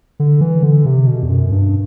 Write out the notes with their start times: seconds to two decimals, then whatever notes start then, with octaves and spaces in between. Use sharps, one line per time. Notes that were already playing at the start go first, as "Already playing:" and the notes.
0.20 D3
0.41 E3
0.63 D3
0.86 C3
1.07 B2
1.23 E2
1.29 F#2
1.52 G2